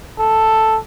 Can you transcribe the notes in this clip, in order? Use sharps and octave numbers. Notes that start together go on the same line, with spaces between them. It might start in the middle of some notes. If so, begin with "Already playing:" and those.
A4